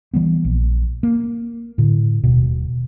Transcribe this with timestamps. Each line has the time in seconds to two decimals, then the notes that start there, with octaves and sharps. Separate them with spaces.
0.14 E3 G3 B3
0.44 A#1
1.03 A#3
1.78 A2 D3
2.24 D#1 B2